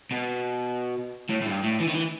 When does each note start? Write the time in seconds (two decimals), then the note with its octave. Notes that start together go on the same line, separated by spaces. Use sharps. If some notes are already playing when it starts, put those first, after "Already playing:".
0.11 B2
1.29 A2
1.41 A2
1.46 G2
1.63 A2
1.80 E3
1.88 D#3
1.94 E3